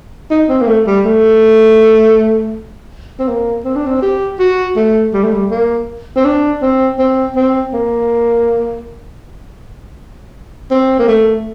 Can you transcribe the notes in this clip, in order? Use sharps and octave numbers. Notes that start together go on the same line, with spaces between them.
D#4
C4
A#3
A3
G3
A3
C4
A#3
C4
D4
C4
G4
F#4
A3
G3
A3
G3
A#3
C4
D4
C4
C4
C4
A#3
C4
A#3
A3